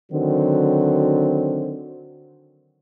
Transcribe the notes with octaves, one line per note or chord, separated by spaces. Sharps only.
D3 D#3 F#3 C4 F#4